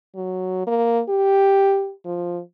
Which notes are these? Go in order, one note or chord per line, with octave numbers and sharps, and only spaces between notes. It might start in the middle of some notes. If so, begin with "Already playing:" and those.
F#3
A#3
G4
F3